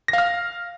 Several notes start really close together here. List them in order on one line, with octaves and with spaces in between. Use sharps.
A#6 F5 F6